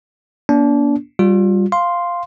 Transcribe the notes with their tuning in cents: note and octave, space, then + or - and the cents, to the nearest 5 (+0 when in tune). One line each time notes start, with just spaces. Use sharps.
A#3 +45 D4 -30
G3 +0 F4 +25
F5 +0 C6 +0